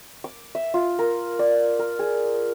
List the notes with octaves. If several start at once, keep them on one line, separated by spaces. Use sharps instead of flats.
D6
E5
F4
A#4
D5
A#4
G#4